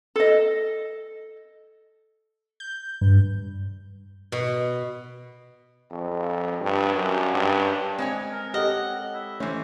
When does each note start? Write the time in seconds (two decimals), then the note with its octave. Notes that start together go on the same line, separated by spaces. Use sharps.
0.16 A4 D#5
2.60 G6
3.01 G2
4.32 B2
5.91 F2
6.61 G2
6.95 F#2
7.34 G2
7.98 G#3 C4 C#5 G#5
8.31 A#4
8.54 G4 A4 D#5 F#5
9.14 E4
9.40 E3 A3 C#4 C5 C#5